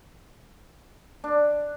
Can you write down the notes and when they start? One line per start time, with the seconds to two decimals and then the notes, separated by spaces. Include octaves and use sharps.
1.24 D4